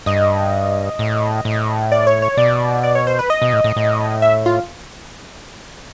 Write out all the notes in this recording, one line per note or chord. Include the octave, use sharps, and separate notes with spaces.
G2 D#5
A2
A2
D5
C#5
C#5
B2 D5
D5
C#5
C5
B4
D#5
B2
A2
A2
A2
E5
F4